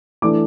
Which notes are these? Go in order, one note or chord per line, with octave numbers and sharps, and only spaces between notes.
E3 A3 D4 D6